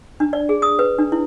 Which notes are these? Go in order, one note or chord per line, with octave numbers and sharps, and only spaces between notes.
D4
D5
G#4
D#6
B4
D4
E4